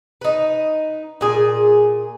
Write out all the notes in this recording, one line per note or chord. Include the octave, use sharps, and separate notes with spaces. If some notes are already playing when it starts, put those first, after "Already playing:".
D#4 B4
A#2 G#4